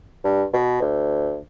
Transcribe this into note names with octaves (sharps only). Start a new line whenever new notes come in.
G2
B2
D2